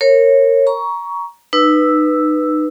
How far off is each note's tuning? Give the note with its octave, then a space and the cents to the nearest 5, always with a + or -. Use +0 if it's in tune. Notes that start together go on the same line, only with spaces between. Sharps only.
A#4 -20 C#5 -20
A#5 +20 C#6 +20
D#4 -30 B4 -5 E6 +0